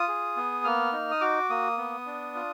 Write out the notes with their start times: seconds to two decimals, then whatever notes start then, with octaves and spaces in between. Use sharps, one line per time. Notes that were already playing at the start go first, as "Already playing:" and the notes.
Already playing: F4 D#6
0.08 G#4
0.37 B3
0.64 A#3 F6
0.92 D#4
1.11 D#6
1.21 F#4 D6
1.50 A#3 D#6
1.78 B3
2.06 D4
2.35 F4